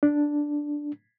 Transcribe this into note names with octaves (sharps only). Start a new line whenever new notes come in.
D4